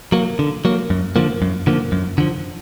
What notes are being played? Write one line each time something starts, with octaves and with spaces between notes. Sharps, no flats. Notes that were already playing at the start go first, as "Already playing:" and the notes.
F#3 A#3
D3
F#3 A#3
F#2
D3 F3 A#3
F#2
D3 F3 A#3
F#2
D3 F3